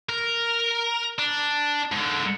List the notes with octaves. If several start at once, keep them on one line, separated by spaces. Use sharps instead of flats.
A#4
D4
G#2 D3